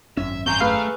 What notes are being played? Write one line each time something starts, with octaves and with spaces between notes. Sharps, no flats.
G#1 F#2 C#4 E5
C4 G#4 G#5 A#5 C#6 G6
A3 G#4 B4 F5